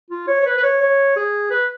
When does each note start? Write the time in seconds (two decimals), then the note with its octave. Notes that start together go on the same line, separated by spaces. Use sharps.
0.10 F4
0.28 C#5
0.40 C#5
0.46 B4
0.58 B4
0.63 C#5
0.81 C#5
1.16 G#4
1.51 B4